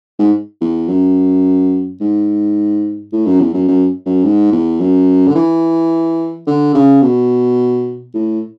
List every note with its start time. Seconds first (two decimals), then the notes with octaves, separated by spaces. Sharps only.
0.19 G#2
0.61 E2
0.88 F#2
2.00 G#2
3.12 A2
3.26 F#2
3.40 E2
3.54 F#2
3.68 F#2
4.05 F#2
4.23 G#2
4.52 E2
4.80 F#2
5.27 D3
5.35 E3
6.47 D3
6.74 C#3
7.02 B2
8.14 A2